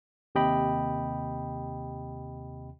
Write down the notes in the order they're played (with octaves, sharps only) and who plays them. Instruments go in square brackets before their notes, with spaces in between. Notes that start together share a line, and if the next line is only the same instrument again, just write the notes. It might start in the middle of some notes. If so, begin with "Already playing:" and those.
[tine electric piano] D#2 C3 G4 D#5 G5 B5